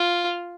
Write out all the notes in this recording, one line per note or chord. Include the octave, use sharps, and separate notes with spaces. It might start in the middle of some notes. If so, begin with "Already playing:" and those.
Already playing: F4